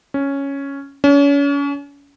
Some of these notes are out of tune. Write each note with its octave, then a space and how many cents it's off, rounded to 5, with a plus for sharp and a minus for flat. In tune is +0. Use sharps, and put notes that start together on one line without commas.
C#4 +0
C#4 +35